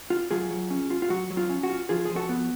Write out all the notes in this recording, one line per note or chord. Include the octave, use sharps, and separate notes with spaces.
F4
F#3 F4 G#4
F#3
C#4
F4
F4
F#3 F#4
F#3
F4
C#4
F#4
F4
F3 F4 G#4
F3 G#4
F#4 A4
B3